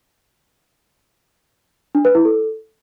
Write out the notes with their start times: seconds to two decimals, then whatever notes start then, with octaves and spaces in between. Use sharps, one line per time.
1.95 D4
2.05 B4
2.15 E4
2.25 A4